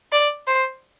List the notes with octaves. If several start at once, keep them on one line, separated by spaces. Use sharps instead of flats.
D5
C5